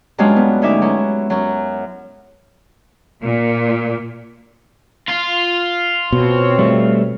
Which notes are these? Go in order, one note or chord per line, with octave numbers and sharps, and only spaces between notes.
G2 F#3 G#3 C#4 D4 F4
B3
D2 C#4 D#4 E5 D6
F#3 C#4 E4
F#2 F#3
A#2
F4
B2 C4 C#5
G3 A3